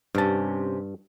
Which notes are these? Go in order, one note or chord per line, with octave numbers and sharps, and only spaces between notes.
G2 C3 C#4 A5